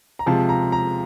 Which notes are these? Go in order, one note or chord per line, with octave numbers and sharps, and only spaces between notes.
A#5
C3 F3 G#3 A5
A#5
A#5